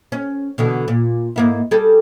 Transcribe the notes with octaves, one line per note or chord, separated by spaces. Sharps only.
C#4
B2 D3 E3
A#2
G#2 A#3 E4
G3 G#4 A4